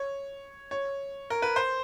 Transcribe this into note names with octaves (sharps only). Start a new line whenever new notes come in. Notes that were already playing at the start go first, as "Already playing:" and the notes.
Already playing: C#5
C#5
A#4
B4
C5